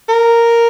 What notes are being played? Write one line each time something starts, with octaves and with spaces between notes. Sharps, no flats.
A#4